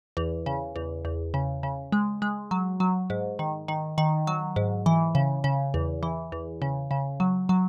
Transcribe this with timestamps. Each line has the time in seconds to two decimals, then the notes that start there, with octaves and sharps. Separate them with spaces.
0.17 E2
0.46 C#3
0.76 E2
1.05 E2
1.34 C#3
1.63 C#3
1.92 G#3
2.22 G#3
2.51 F#3
2.80 F#3
3.10 G#2
3.39 D#3
3.68 D#3
3.98 D#3
4.27 F#3
4.56 G#2
4.86 E3
5.15 C#3
5.44 C#3
5.74 E2
6.03 E3
6.32 E2
6.62 C#3
6.91 C#3
7.20 F#3
7.49 F#3